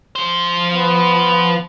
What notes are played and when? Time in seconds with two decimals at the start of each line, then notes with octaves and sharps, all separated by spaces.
0.15 F3 C5
0.72 B3